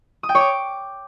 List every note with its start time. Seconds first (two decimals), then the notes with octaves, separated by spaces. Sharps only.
0.23 D#6
0.29 G5
0.35 C#5
0.41 D6